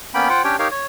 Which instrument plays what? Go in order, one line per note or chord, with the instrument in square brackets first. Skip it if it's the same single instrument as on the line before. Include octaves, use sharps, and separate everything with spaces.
[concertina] A#3 B3 C#4 G5 B5
F4 C5 F#5 G5
C#4 D4 G4 C#5 G5
D#4 G4 A#4 C#5 F5
C#5